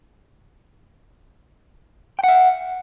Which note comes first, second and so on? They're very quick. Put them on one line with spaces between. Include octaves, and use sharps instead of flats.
G5 F#5 E5